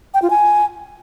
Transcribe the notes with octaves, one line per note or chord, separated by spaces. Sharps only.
G5
F4
G#5